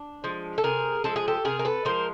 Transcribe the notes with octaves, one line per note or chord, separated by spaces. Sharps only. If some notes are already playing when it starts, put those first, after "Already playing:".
Already playing: D4
F3 G#3
A4
C3 G#4 A#4
F3 G#3 A4
G#4
G4 A4
C3 G#4 A#4
A#4
A4 B4
F3 G#3 A#4 C5